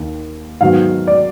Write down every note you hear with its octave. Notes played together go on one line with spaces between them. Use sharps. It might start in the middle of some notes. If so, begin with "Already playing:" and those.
Already playing: D#2 D#3
G#2 D#3 F#3 B3 F5
D5